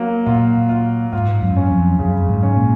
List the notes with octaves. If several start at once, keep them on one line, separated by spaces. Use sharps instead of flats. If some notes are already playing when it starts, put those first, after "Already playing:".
Already playing: F#3 A#3
A#2 F4
F4
G#2 F4
F#2
C#4
F2
F#2 C#3
G#2
C#4
A#2